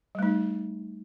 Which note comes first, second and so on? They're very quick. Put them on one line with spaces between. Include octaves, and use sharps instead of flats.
G3 A3 D#4